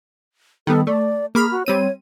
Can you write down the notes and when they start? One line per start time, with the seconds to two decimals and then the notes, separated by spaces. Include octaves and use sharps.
0.67 D#3 G3 B3 A4
0.87 A3 D5
1.35 A#3 G#4 B5 F6
1.51 F#4
1.66 G3 C4 C#5 D#7